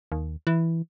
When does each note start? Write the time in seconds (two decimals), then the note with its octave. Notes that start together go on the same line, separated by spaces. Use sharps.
0.12 D#2
0.47 E3